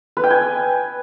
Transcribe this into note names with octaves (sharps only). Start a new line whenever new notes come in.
B4
G5
G#5